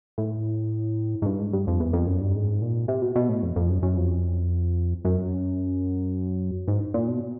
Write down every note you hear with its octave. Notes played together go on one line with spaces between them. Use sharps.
A2
G#2
G2
G#2
G2
F2
E2
F2
F#2
G2
G#2
A#2
C3
B2
B2
A2
F2
F2
F#2
F#2
F2
F#2
G#2
A#2
B2